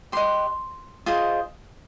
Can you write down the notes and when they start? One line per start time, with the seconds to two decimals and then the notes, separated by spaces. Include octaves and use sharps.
0.12 G4 B4 D#5 C6
1.06 F4 G#4 C5 D#5